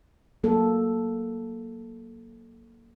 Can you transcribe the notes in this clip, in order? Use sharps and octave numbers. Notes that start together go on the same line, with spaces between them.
F#3 A#3 A4